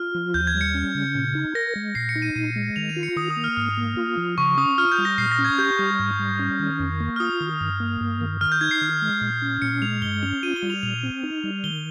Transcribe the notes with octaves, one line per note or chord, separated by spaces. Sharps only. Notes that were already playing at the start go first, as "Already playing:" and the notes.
Already playing: F4 F6
F3
D#2 G6
G#6
G3
C#7
C#4
C#3
A#2
D#4
A#4 A#6
G#3
A#2 C7
C#7
D#4
D#7
A#2 D#7
G#3
D#3 F7
D#7
F4
C#7
D#3 D#6
D#6
A#3
F6
G#2 F6
A#3
F4
F3
C#3 C#6
C#4 D#6
F4 F6
G6
G3
A#6
A#2 C7
A#6
C#4
G#6
G4 G6
G3
G#2
G3
C#4
D#3
F2
A#3
F6
F4 D#6
D#3
G2
A#3
G2
D#3
D#3 F6
G6
D#4 G#6
C7
D#3
G#3
A#2
C#4
A#2 C#7
G#3 F7
G2 G7
C#4 F7
F4 D#7
G7
G3
F7
A#2 F7
C4
D#4
G3
D#3 G7